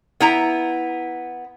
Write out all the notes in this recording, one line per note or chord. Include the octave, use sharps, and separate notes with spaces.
B3 E4 A#5